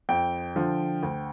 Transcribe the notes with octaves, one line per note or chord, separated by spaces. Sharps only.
F2 G5
D3 F3
D2